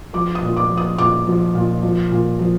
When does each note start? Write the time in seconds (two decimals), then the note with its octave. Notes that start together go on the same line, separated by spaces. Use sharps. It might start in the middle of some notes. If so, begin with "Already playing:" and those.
0.14 F3 D6
0.35 D#6
0.43 A#2
0.57 D6
0.71 F3
0.77 D#6
0.98 A#2 D6
1.27 F3
1.55 A#2
1.83 F3
2.11 A#2
2.39 F3